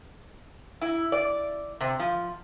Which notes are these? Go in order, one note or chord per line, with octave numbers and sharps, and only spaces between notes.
E4
D5
C3
F3